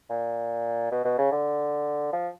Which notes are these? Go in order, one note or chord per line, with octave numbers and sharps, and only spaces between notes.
A#2
B2
B2
C#3
D3
F3